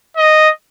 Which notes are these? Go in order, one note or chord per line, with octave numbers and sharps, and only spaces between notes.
D#5